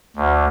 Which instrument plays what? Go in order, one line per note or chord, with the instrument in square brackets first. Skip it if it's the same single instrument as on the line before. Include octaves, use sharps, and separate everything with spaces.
[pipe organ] D2